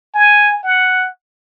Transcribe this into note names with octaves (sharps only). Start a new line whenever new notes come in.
G#5
F#5